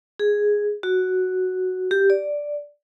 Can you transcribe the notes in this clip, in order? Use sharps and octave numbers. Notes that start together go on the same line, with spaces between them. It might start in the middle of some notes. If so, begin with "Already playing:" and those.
G#4
F#4
G4
D5